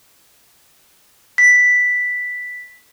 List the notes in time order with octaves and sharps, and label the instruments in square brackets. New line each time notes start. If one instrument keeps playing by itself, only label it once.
[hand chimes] B6